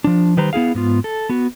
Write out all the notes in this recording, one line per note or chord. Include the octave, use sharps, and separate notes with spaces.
F3 D4
D#3 G3 B4 C5 A#5
B3 E4 G#4 F5
G#2 B3 F4
A4
B3 F#4